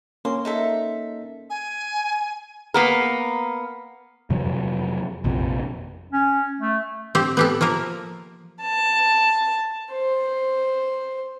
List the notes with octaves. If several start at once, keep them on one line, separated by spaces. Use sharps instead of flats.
A#3 C#4 A#4 C6
D#4 A4 E5
G#5
A#3 B3 A#4
F2 C3 F3 F#3
A#1 F2 C3
C#4
A3
C4 G4
B3 G4 A4
F3 A#3 A#4
A5
C5